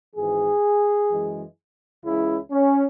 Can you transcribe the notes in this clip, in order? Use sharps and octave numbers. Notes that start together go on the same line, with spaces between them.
G#1 G#2 E3 G#4
F#2 E3 G#3
C#2 C#3 E3 G#3 E4
C#4